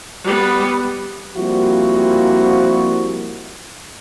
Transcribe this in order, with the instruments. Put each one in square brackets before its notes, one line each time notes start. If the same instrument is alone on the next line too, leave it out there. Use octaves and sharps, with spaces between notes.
[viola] G3 B3
[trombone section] F3 G3 A#3 C4 E4 F#4